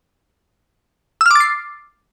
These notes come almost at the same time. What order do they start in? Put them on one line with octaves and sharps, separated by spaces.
E6 F6 D6 A6 C7